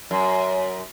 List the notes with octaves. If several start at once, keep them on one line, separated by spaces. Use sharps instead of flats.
F#2